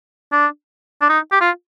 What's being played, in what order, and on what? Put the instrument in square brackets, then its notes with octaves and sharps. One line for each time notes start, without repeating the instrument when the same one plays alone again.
[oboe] D4
D4
D#4
G4
F4